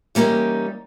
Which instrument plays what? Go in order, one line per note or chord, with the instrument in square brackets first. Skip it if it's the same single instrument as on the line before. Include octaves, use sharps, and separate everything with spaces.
[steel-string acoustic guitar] E3 G3 A#3 C#4 D#4